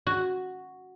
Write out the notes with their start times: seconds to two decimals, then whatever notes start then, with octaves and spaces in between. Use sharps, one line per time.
0.07 F#4